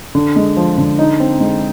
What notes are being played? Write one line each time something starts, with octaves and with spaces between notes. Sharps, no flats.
D3
G#3
F3
D3
D#4
C4
G#3